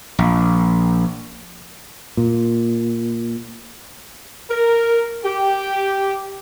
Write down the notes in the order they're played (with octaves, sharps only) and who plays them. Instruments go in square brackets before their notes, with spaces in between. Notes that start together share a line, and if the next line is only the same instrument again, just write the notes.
[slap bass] A#1
[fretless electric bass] A#2
[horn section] A#4
G4